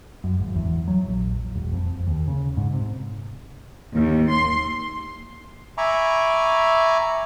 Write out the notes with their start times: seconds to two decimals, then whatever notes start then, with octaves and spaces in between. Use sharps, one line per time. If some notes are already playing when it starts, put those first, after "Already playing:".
0.24 F#2
0.39 G#1
0.56 E2
0.88 F#3
1.07 A#1
1.55 E1
1.72 F2
2.07 D#2
2.28 C#3
2.57 G#2
2.73 C3
3.95 D#2
4.32 C6
5.78 E5 G#5 A#5 B5 C#6 D6